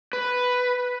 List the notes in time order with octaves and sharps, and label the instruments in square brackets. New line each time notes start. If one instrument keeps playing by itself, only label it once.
[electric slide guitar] B4